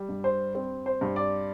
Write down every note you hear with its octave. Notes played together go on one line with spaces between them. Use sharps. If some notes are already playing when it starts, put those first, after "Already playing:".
Already playing: G3
G2
C5
C4
C5
G2
D5